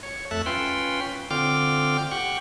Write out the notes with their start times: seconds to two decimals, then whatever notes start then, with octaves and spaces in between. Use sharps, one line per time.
0.03 C#5
0.31 F2 A3 A4 E5 F#6
0.46 C#4 F4 B4 G5 C6
1.31 D3 C4 F4 G5 D6 F6
2.11 G4 F#5 G5 C#6